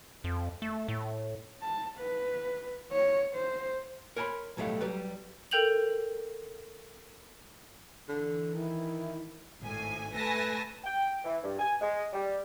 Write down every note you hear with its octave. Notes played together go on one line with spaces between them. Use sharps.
F2
A3
A2
A5
B4
C#5
C5
A#4 C#5 G#5 A5 B5 C6
B1 A2 F#3 G3 A3 F5
F#3 G3 B4
A4 A#4 G5 G6 F7 F#7
D3 E3
D#3 E4
G#1 A2 G#5
A3 B4 G#5 A5 A#6
G5
E3
G2
G#5
G#3
G3